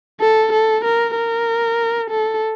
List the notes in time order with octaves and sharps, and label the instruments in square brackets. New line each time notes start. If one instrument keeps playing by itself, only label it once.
[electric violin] A4
A4
A#4
A#4
A4